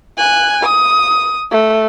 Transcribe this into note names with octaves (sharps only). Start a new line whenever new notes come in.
G#5 F#6
D#6
A3